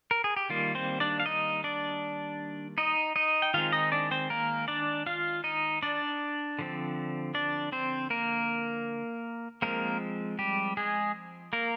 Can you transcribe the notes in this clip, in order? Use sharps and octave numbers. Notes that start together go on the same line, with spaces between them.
A#4
G#4
G4
D#3 G3 A#3 F4
C4 C5
D4 D5
F5
D#4 D#5
D4 D5
D#4 D#5
D#4 D#5
G5
D#3 G#3 C4 F4 F5
D#4 D#5
D4 D5
C4 C5
A#3 A#4
D4 D5
F4 F5
D#4 D#5
D4 D5
D3 F3 C4
D4 D5
C4 C5
A#3 A#4
F3 G#3 A#3 C4 A#4
G3 G4
G#3 G#4
A#3 A#4